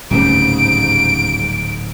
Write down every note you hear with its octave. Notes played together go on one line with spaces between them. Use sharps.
D1 G#2 C#3 G3 C4 D7